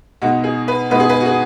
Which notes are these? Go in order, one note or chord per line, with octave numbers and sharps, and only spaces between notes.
B2 G#3 B3 D#4 F#4
G#4
B4
B2 G#3 B3 D#4 B4
G#4
B4
F#4
G#4